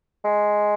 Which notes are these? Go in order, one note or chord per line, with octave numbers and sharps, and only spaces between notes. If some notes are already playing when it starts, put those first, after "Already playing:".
G#3